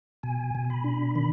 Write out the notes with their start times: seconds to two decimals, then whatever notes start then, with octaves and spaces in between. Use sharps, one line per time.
0.23 B2 G#5
0.55 B2
0.70 B5
0.84 D4
1.15 D#3 B5